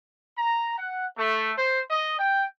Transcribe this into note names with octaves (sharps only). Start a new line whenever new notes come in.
A#5
F#5
A3
C5
D#5
G5